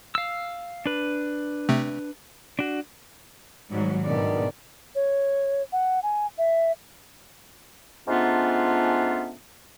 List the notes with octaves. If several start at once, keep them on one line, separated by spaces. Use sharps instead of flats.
F5 E6
D4 B4
C3 A3 C4
D4 F#4
G#1 G#2 F#3 G3
E2 B2 D3 D#3 D5
C#5
F#5
G#5
E5
G#2 A3 B3 C#4 D4 F4